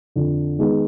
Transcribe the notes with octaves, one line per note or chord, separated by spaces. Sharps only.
F2 D3 F3
D#3 G#3 B3 D#4 G#4